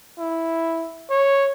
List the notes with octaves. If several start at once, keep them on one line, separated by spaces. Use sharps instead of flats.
E4
C#5